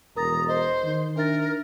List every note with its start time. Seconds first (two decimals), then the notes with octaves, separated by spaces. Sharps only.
0.16 E1 A#4 A#5 D#6 A6
0.48 C5 D#5
0.84 D#3
1.16 D4 A#4 E5 A6